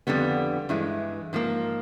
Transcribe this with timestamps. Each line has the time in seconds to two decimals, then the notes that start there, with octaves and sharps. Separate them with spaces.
0.07 F2 D3 G3 B3
0.69 G2 E3 G#3
1.33 G#2 F3 A#3